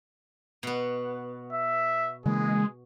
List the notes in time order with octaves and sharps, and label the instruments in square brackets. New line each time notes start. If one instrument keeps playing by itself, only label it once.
[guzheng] B2 B3
[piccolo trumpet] E5
[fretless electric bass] C#3 E3 A#3 [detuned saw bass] G#3 [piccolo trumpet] G#4